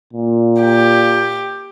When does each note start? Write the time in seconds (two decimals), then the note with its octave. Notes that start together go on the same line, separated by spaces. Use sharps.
0.13 A#2
0.63 G4